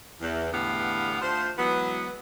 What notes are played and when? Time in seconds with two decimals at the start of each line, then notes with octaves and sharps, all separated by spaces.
0.21 E2
0.52 E2 A2 D3 B3 G4 F5
1.22 A3 D4 F4 C5
1.57 E3 F#3 G#3 B3